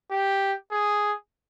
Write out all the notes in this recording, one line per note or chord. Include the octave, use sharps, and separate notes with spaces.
G4
G#4